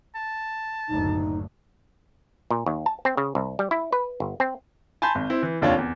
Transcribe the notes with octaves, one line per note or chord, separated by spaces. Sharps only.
A5
F#1 D2 A2 D#4
A#2
D#2
A5
C4
C#3
C2
G3
E4
B4
G1
C4
G#5 A5 B5 C6 G6
G#1
C4 E4
E3
F1 D#2 D4 F4 C#5
E2